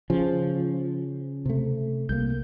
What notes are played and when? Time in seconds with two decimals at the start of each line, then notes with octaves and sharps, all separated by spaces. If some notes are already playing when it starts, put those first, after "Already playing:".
0.10 C#3 F3 C#4
1.46 C3 A3
2.09 C2 A#3 G6